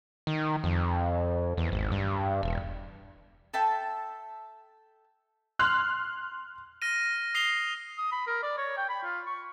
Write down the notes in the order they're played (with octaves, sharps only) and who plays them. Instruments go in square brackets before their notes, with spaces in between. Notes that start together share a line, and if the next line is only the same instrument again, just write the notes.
[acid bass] D#3
F2
E2
G#1
G2
E1
[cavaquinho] A4 E5 G5 A5
[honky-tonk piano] C6 F6 F#6
[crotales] F6 A#6 D#7
D#6 C7 F7 G7
[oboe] D#6
B5
A#4
D5
C#5
G5
B5
F4
C#6